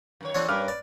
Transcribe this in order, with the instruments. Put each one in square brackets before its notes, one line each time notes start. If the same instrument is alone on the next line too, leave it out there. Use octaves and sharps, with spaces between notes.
[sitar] F#2 D#3 C#5
[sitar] E3 A4 [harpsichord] C4 D4 C#5
[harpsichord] G2 [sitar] A#3 C#4 A#4 [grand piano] B4 D6 F6
[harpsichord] D5